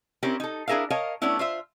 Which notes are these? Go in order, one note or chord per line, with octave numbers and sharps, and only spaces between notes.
C4 C#4 E4 G4 A#4
D#4 A4
D4 E4 G#4 A#4 E5 F5
A#4 C#5 D#5 F5 A5
A3 B3 C#4 D4 E4
F4 C5 E5